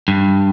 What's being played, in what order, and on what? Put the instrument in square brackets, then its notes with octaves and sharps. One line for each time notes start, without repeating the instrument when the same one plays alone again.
[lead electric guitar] G2